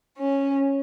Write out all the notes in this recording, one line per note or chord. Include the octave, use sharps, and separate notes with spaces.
C#4